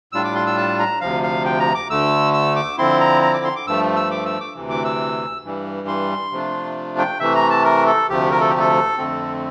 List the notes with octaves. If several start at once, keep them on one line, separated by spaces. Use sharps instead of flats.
A2 G3 D4 F4 E6
D6
C6
E6
A5
A#5
D2 C3 F3 F5
F5
G5
A#5
D6
D2 D3 A3 E6
E6
D6
D3 F3 C4 E4 C6
A#5
A#5
D6
C6
D6
G2 F3 A3 E6
E6
D6
E6
D6
D2 C3 E3
D6
E6
G2 E3 G3
C6
C3 F3 A3 D4 F4
G5
C3 E3 A3 E5
A#5
A5
A#4
A4
D2 C3 F3 A3 G4
A#4
A4
G4
A4
F2 D3 A3 C4